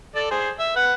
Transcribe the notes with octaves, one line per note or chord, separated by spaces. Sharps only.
A4 D5
G#4 C5
E5
B4 F#5